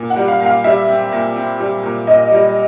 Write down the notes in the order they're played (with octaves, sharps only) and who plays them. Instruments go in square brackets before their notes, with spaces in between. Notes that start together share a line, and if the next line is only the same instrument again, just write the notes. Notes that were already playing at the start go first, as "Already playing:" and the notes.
Already playing: [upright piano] A#2
[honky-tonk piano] F#5
[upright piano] G3
[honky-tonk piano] F5
[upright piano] A#2
[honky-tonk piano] F5
[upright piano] G3 [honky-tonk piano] E5
[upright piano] C4
A#2
C4
G3
A#2
[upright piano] A#2 [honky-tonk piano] D#5
[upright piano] G3